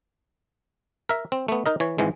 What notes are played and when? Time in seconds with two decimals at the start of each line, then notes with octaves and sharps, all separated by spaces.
1.09 A#4 E5
1.32 C4
1.48 A3 B3
1.66 D#4 A#4 D#5
1.80 E3 C#5
1.98 G#1 G#2 E3 G#3